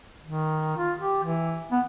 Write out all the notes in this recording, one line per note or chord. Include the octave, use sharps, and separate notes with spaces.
D#3
F4
G4
E3
B3